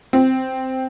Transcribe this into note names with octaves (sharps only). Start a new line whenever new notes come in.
C4